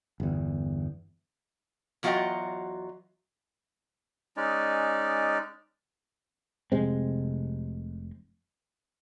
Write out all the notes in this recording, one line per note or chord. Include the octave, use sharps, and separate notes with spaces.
G1 E2
E2 F#3 F4 F#4 D#5 G5
G#3 C#4 D#4 D5
F1 C3 G#3 C4